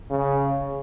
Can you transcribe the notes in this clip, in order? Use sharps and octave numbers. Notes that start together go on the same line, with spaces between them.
C#3